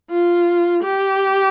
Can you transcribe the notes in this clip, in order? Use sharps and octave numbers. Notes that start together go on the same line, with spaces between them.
F4
G4